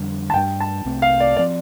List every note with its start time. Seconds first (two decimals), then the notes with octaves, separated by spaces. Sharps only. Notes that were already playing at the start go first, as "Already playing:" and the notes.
Already playing: F2 D3 G3 D4
0.30 A5
0.34 G2 G3 D4 G5
0.60 A5
0.85 C2 C3 A3 C4
1.02 F5
1.20 D5
1.37 F3 C4 D5